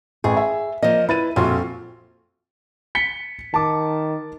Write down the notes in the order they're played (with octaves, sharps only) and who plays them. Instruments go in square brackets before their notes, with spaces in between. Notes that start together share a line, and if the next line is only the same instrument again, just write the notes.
[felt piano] A1 [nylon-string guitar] G#4
[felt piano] E5
[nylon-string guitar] F3 D#5 [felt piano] A#3
[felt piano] E4 A6 D#7 [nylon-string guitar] B4
[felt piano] A#1 F4 F#4 [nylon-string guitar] F2
[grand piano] B6 C#7 G7
[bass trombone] D#3 [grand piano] A5 D6